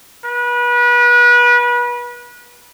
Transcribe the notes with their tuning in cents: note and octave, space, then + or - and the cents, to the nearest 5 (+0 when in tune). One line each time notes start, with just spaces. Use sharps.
B4 -30